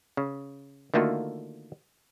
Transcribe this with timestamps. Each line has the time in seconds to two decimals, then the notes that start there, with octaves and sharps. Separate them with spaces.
0.17 C#3
0.94 D3 D#3 A3 A#3 F4 F#4